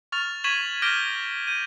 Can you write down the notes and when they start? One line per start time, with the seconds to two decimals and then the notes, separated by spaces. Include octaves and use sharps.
0.12 C#6 F6 A6 F7
0.44 C#6 G#6 B6 D#7 E7 F#7
0.82 D6 F6 G6 A#6 D7 G7
1.47 G6 D#7